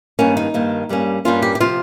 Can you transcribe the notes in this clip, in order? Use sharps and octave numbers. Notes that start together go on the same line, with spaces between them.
G2 D#3 A#3 C#4
D#4
G2 D#3 A#3
G2 G3 A#3 C#4
G2 G3 A#3 C#4 F4
G4
G4
C3 F3 C4 F4